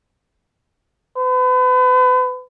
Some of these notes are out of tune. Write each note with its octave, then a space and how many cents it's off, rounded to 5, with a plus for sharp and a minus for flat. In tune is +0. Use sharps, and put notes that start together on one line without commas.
B4 +35